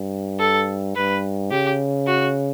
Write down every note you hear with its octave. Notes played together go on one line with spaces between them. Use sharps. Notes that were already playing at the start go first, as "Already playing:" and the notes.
Already playing: G2
A4
G2 B4
C#3 G4
F#4